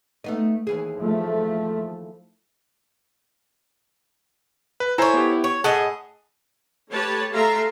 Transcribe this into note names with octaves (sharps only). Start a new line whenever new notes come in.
A3 B3 D#4
D#2 E3 G#4
F3 A3
B4
E4 A4 C5 C#5 G#5 A#5
B3 G4
C#5
A2 G#4 D#5 F#5 A5
A3 G4 B4 C#5 A5
A3 E5 F5 A#5 C6